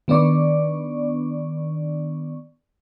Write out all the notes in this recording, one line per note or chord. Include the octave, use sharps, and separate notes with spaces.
D#3 B3 D4 D5 C#6